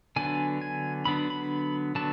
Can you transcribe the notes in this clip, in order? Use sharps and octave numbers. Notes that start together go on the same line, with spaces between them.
D3 F#3 B3 D4 G#5
G#5
D3 F#3 B3 D4 B5
B5
D3 F#3 B3 D4 A5